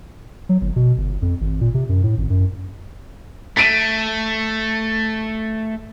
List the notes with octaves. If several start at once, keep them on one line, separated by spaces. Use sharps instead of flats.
F#3
G1
B2
G1
F2
G#1
A#2
C3
F#2
A2
G#1
F#2
A3 B6 D7 D#7